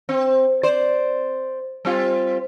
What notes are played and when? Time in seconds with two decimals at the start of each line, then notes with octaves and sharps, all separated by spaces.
0.09 C4
0.63 C5 D5
1.85 G3 C4 F4